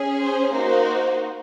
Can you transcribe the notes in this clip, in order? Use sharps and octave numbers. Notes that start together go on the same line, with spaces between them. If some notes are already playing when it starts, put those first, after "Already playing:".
Already playing: C#4 G#4
C5
A#3 D#4 F#4 C5